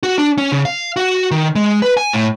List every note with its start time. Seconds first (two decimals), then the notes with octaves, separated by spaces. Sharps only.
0.03 F#4
0.18 D4
0.38 C#4
0.52 C#3
0.65 F5
0.96 F#4
1.31 D#3
1.55 G#3
1.82 B4
1.97 G#5
2.13 A2